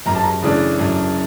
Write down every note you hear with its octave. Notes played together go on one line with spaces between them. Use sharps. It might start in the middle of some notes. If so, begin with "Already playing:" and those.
F#2 A#5
A5
A#5
C#3 E3 A3 D4
F#2